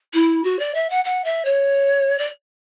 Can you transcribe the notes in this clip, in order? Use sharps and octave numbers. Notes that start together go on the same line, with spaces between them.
E4
F#4
D5
E5
F#5
F#5
E5
C#5
D5